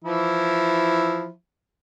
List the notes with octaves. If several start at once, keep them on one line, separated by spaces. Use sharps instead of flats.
E3 F3 E4